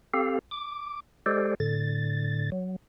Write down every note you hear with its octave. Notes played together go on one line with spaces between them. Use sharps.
C4 G4 A4 F5
D6
G#3 G4 A4 C5 D5
A2 D3 A6
F#3